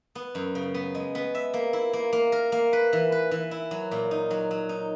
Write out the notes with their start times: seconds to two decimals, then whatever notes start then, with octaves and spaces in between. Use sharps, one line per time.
0.15 B3
0.35 F#2
0.55 C#3
0.74 B3
0.95 G#3
1.15 B3
1.35 E5
1.54 A#3
1.73 E4
1.93 A#3
2.13 A#3
2.32 A#4
2.52 A#3
2.73 B4
2.93 E3
3.12 B4
3.31 E3
3.51 E4
3.71 F#3
3.91 A#2
4.11 D#4
4.31 F#3
4.51 F#3
4.69 D#4